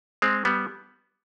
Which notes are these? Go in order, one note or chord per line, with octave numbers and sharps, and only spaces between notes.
G#3 C4
G3 B3